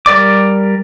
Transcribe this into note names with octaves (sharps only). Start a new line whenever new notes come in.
G3 A#4 D5 D6